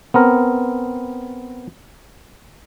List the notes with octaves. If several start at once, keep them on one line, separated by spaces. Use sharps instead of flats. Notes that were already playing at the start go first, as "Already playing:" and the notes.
B3 C4 A#4